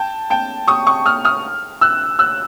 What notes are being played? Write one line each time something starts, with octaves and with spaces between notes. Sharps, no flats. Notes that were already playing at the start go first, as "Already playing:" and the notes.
Already playing: G5 A5
G5 A5
C#6 D#6
C#6 D#6
D#6 F6
D#6 F6
E6 F#6
E6 F#6